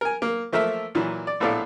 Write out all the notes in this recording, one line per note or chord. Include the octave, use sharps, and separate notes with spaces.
A#4 G#5
A#3
F3 A3 A#3 A#4 E5
A#2 E3 F#3
D5
A#1 A2 B3 A4 D5 F5